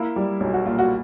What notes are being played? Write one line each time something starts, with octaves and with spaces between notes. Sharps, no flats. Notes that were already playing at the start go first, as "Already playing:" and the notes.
Already playing: A#3 E4
G3
B1
F#4
A#2 F4
F#4